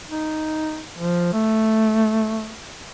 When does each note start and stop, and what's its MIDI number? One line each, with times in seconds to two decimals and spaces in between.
0.10 0.82 63
0.99 1.33 53
1.33 2.54 57